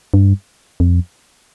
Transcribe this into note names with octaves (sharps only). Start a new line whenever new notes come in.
G2
F2